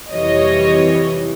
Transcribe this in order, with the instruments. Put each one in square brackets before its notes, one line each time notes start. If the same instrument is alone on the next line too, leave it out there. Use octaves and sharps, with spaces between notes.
[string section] F2 C3 E3 G3 C#5 D#5